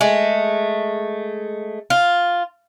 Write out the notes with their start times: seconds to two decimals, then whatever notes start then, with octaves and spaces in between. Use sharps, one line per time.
0.01 G#3 A3
1.90 F4